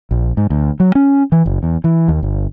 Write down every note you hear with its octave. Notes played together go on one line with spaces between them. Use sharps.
A#1
G#2
D2
F#3
C#4
E3
F#1
E2
E3
D#2
G1